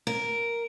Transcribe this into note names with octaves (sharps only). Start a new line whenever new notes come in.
A#4